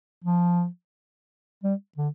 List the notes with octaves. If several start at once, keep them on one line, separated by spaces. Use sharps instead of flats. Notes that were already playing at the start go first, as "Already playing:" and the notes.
F3
G3
D3